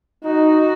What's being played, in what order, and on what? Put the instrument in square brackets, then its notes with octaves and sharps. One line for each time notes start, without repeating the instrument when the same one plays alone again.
[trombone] D#4 [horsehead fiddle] F#4